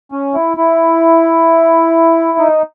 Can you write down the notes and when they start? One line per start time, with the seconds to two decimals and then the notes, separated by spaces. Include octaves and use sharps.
0.12 C#4
0.34 E4
0.57 E4
2.38 D#4